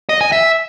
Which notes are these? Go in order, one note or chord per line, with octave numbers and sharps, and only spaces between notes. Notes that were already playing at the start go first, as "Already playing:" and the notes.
D#5
G#5
E5